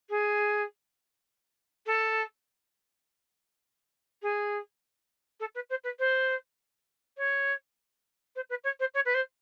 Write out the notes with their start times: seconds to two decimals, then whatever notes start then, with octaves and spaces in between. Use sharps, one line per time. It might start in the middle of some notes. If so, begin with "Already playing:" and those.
0.09 G#4
1.86 A4
4.22 G#4
5.40 A4
5.55 B4
5.69 C5
5.83 B4
5.99 C5
7.17 C#5
8.35 C5
8.49 B4
8.63 C#5
8.79 C5
8.94 C#5
9.05 B4
9.14 C5